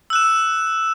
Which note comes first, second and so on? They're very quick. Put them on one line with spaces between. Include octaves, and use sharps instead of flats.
E6 F#6 E7